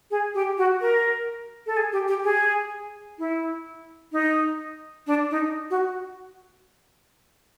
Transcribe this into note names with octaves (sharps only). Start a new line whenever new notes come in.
G#4
G4
F#4
A#4
A4
G#4
G4
G4
G#4
E4
D#4
D4
D#4
F#4